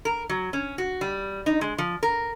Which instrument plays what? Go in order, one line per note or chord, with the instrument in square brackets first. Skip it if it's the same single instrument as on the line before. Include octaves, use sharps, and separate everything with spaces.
[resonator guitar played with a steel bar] A#4
F#3
C#4
F#4
G3
D#4
G#3
F3
A#4